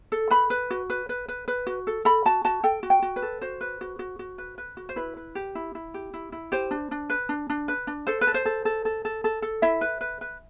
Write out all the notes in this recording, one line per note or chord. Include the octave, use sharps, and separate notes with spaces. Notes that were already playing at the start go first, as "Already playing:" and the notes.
A4
B4 B5
B4
F#4
B4
B4
B4
B4
F#4
A4
A4 B5
F#4 A5
F#4 A5
A4 G5
F#4
G5
F#4
B4
A4
F#4 C5
B4
F#4
F#4
F#4
B4
B4
F#4
C5
E4 B4
B4
G4
E4
E4
G4
E4
E4
G4 C5
D4
D4
B4
D4
D4
B4
D4
A4 C5
B4
A4
C5
A4
A4
A4
A4
A4
A4
E4 E5
B4
B4
B4